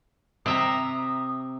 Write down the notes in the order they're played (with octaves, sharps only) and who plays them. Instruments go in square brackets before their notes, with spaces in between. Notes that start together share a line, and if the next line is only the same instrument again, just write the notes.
[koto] C3 E5 A#5 [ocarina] D#6